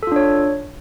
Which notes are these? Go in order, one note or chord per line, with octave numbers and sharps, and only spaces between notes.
D4 F4 A4 C#5